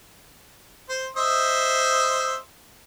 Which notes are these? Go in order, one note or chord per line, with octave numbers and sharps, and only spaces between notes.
C5
C5 D#5 E5